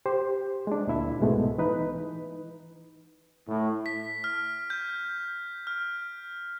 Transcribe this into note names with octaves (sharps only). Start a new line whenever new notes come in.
G4 C5
G#3 D4
D2 A#2 E4 E5
C2 G#2 B2 G#3 A3 B3
E3 D#4 B4
A2
B6
F6
G6
F6